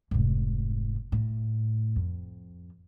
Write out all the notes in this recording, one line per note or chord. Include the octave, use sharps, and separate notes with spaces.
F1 G#2
A2
F2